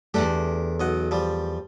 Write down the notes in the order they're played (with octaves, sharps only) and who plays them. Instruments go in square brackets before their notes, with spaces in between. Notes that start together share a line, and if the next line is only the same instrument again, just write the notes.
[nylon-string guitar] E2 G#2 A3 [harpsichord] D4 G4
[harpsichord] B1 D#5 F#5
F3 G3